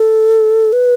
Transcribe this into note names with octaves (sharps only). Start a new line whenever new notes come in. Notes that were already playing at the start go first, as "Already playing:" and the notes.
Already playing: A4
B4